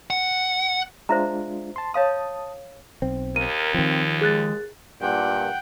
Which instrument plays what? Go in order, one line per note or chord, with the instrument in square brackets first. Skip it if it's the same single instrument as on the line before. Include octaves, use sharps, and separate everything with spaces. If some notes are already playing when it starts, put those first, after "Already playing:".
[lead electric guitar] F#5
[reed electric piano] G#3 D4 F4 [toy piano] C5 E5 A#5
[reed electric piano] A5 C6
[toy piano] C#5 F5 C6 [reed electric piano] A5 D#6
[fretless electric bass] B1 C4
[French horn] D#2 [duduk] A#4 [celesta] D#7
[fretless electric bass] D#3 F3 [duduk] C4
[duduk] G#3 [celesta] G#4 F#6 A6
[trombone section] G2 A#2 [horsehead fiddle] F#5 G5